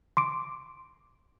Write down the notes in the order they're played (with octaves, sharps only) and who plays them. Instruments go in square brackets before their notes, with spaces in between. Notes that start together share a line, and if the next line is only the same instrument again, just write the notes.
[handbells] C6 D6 D7